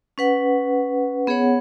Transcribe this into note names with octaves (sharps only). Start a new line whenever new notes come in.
C#4 B4 F#5
B3 G#4 C#5 F#5